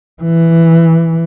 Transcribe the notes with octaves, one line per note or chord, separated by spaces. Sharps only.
E3